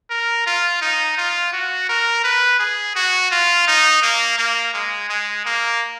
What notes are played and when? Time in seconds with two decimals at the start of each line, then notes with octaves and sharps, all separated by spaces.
0.10 A#4
0.46 F4
0.82 D#4
1.18 F4
1.53 F#4
1.89 A#4
2.24 B4
2.59 G#4
2.96 F#4
3.31 F4
3.68 D#4
4.03 A#3
4.38 A#3
4.74 G#3
5.10 G#3
5.46 A#3